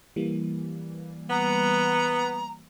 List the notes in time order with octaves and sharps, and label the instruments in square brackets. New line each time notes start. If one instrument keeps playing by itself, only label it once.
[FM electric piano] E3 G3 A#3
[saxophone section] B3 [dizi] A#5